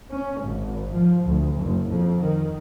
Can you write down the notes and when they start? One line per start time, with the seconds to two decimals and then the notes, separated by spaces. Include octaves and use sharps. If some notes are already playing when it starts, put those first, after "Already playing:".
0.10 C#4
0.41 G#1
0.94 F3
1.26 D2
1.56 F#1
1.89 F2
2.21 D#3